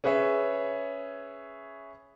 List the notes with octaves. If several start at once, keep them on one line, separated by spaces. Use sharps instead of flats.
C#4 G#4 B4 C#5 E5